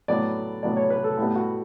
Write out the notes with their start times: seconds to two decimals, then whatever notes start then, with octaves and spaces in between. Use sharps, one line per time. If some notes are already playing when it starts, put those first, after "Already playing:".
0.08 A2 F#3 B3 D5
0.63 A2 F#3 B3 D5
0.76 C#5
0.90 B4
1.04 A4
1.18 A2 G3 B3
1.36 F#4